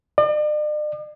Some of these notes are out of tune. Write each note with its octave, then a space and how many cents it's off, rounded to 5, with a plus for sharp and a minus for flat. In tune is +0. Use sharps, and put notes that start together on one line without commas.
D5 +45